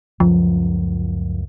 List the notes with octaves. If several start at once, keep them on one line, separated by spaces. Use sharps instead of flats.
C#2 F#2 F3